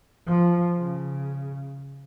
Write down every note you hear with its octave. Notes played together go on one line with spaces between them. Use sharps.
F3
C#3